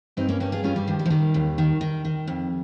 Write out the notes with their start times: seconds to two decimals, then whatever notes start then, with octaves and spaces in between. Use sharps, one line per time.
0.17 G2 C4 D#4
0.29 A#3 C#4
0.40 G2 A#3 C#4
0.52 F4 G#4
0.64 G2 C#4 F4
0.76 G3
0.87 D#3 F3
0.99 G3
1.06 F3
1.10 D#3 G3
1.34 D#2
1.58 D#3
1.81 D#3
2.05 D#3
2.27 F2